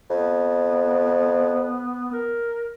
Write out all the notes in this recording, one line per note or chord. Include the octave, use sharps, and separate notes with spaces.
F2 B3
A#4